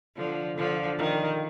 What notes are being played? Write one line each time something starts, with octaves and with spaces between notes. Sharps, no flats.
D3 F3
D3 F3
D#3